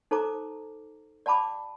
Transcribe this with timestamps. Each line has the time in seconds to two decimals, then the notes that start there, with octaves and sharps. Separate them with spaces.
0.11 D#4 A4 C5 A#5 D6
1.26 D5 F#5 A5 B5 D6